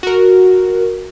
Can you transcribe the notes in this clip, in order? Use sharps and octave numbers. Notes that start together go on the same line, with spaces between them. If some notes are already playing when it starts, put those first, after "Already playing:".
F#4 A#4